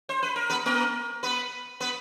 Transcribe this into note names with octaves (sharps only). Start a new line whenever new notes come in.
C5
B4
A#4
B3 B4
A#3 A#4
B3 B4
B3 B4